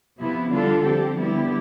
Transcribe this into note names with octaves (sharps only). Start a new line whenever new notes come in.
C3 F3 B3 E4
D3 G3 D4 F4 A4
F3 C4 G4
D3 G3 B3 E4 G4